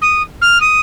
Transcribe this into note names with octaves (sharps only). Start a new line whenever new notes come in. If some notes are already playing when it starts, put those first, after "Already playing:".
D#6
F6
D#6